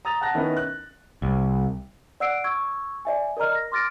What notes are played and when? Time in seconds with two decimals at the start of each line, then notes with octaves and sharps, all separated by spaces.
0.05 A#5 D#6 A6 F7
0.21 F#5 A5 F#6 A#6
0.34 D#3 B3 C#4 E4 A#4 B4
0.57 F#6
1.22 C2
2.20 D5 F#5 E6 F#6 C7 D7
2.44 C#6 E6 G#6
3.05 D5 E5 G#5
3.37 A#4 D5 D#5 A#5 F6
3.55 A#6
3.72 C6 D6 F6 A6 A#6 D7